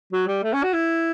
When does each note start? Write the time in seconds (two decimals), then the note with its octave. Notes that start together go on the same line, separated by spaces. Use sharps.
0.13 F#3
0.28 G3
0.43 A3
0.53 C#4
0.63 F#4
0.74 E4